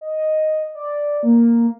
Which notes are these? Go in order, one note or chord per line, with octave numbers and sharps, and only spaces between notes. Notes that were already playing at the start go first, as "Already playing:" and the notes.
D#5
D5
A#3